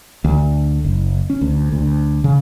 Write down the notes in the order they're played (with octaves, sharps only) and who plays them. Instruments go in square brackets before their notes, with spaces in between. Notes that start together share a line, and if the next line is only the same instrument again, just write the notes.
[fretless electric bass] D2
F#1
C#4
D2
D2
C#3